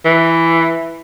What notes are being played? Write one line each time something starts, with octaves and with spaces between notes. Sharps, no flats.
E3